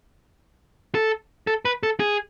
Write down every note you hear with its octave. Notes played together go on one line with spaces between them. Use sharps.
A4
A4
B4
A4
G#4